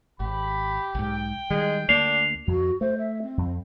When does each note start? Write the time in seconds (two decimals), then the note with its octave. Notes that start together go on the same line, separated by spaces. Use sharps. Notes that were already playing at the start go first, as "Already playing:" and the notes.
0.20 G#1 G4 B5
0.95 B1 G#2 G5
1.50 D#3 G3 G#3
1.89 D2 A#3 D4 C7 F7
2.47 F2 F#4
2.81 A3 C5
2.98 E5
3.22 C4
3.38 F2